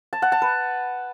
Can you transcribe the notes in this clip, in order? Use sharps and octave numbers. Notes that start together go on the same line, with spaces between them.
A5
F#5
A5
B4